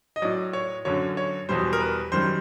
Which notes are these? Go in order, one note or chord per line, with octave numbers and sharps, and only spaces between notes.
D#5
A2 F#3 D5
C#5
F#2 D3 F#3 C#5
C#5
E2 B2 G3 C5
A#4
B4
F#2 D#3 G3 C5